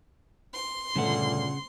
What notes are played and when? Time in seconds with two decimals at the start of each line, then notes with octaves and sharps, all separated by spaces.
0.54 C6
0.96 G1 A#2 C#3 A3 F#5